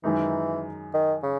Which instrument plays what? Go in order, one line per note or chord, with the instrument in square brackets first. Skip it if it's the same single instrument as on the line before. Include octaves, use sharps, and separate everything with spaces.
[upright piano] F#2 D#3 G#3 D#4 [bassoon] E3
[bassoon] D#3
C#3